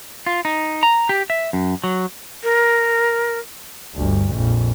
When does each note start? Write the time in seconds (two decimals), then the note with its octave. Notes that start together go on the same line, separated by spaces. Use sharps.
0.26 F4
0.45 D#4
0.83 A#5
1.09 G4
1.30 E5
1.53 F#2
1.84 F#3
2.44 A#4
3.96 G1 D2
4.33 A#1 F2